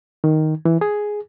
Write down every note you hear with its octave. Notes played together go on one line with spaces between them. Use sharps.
D#3
E3
G#4